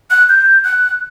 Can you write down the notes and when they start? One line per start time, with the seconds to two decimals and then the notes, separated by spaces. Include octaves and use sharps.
0.10 F#6
0.29 G6
0.64 F#6